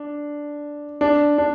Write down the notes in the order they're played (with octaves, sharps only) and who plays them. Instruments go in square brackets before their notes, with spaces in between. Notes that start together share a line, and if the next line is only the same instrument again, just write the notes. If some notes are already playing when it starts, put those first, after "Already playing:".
Already playing: [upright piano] D4
D4
D4